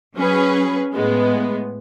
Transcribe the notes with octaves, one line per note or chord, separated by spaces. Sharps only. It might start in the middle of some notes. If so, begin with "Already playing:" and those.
F#3 C#4 G#4 B4
A2 G#3 B3